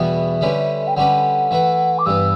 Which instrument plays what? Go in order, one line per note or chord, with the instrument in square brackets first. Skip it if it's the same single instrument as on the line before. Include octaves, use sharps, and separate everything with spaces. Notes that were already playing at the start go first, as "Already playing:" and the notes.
Already playing: [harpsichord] E2 B2 G3 B3 F#4 [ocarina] E5
[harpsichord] D3 G3 C#4 G4 B4
[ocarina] G5
[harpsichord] D3 G3 C#4 G4 B4 [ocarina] F#5
[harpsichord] E3 A3 E4 B4
[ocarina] D6
[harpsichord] G2 E3 B3 [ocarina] E6